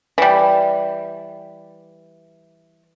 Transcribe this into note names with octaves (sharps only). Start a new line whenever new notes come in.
E3 G3